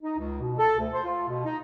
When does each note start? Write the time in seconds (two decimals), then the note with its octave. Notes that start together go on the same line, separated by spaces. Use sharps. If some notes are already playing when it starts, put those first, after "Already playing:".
0.03 D#4
0.18 C#2
0.40 B2
0.58 A4
0.78 D2
0.93 C5
1.05 F4
1.28 B2
1.45 D#4